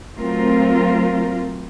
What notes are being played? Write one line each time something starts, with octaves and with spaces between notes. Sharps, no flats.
F#3 A3 C4 F4 A#4